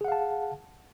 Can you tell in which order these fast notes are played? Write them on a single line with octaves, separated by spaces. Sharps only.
G#4 F#5 F5 A5